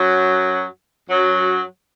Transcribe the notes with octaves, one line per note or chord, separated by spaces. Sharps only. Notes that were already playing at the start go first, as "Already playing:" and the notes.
Already playing: F#2 F#3
F#2 F#3